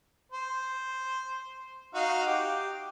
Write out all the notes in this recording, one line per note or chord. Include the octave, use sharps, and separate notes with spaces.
C5
D#4 F#4 F5
G4